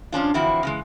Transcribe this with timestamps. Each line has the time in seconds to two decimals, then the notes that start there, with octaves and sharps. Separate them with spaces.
0.12 F3 C#4 D4 F4
0.34 D3 E3 F3 C4 E4 F#4
0.63 C#3 E3 G#3